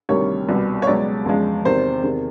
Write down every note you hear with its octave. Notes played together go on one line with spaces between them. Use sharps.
D2 C3 D#3 G3 C#5
C2 B2 G3
C#5
C#2 B2 F#3 D5
E2 C#3 F3 G#3
E2 C3 D#3 C5
E2 C3 D#3